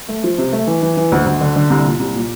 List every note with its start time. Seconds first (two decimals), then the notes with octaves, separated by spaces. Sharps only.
0.09 A3
0.23 F3
0.38 C3
0.53 A3
0.67 E3
0.82 E3
0.97 E3
1.12 D2
1.26 D2
1.41 D3
1.56 D3
1.70 C2
1.85 A#2
2.00 C2
2.15 A#2